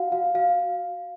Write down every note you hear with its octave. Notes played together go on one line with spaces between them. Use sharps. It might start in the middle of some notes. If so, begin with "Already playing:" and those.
Already playing: F#4 F5 F#5
F#4 F5
F#4 F5